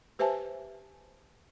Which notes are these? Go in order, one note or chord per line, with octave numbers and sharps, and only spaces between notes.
G4 B4 C5 E5 G#5 A5